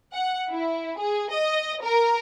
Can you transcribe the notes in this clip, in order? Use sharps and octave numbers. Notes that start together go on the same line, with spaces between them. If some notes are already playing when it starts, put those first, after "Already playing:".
F#5
E4
G#4
D#5
A#4